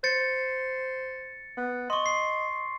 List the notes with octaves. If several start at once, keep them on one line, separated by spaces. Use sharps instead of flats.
C5 A6 C#7
B3
D#5 C6 C#6
C7